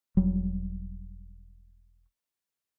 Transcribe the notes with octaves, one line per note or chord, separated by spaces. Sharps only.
E1 F#3 G3